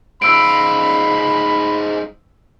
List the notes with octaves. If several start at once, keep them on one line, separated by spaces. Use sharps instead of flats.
G#2 F4 B5 E6 D7